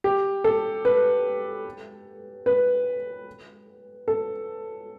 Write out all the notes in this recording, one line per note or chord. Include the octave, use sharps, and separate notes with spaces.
G4
A4
B4
B4
A4